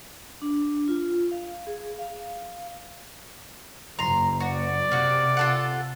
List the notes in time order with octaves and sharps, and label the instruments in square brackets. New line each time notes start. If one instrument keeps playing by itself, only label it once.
[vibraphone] D4
F4
F5
G#4
F5
[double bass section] F#1 [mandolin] A#5 C6
[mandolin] F#4 [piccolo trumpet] D5
[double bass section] C3 [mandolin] A#3 F#4
[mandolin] F4 A4 F#5